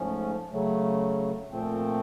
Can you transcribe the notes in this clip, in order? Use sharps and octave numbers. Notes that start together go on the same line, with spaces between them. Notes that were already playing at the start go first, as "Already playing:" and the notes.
Already playing: G#2 F3 A3 C#4
C#3 F#3 A3
A#2 F3 A3 C4